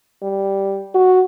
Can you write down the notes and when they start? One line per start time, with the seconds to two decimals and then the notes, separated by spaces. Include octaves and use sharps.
0.22 G3
0.94 F#4